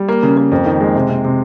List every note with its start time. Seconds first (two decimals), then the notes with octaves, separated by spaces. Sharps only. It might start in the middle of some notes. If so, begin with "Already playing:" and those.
Already playing: G3
0.08 A#3
0.23 C#3
0.37 A#3
0.52 F2
0.66 D#3
0.81 G#3
0.95 C3
1.10 C3
1.24 C3